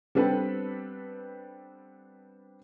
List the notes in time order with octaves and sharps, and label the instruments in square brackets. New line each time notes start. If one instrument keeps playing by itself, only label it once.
[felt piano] G3 B3 C4 D4 A4 B4